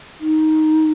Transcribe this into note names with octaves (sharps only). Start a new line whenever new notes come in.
D#4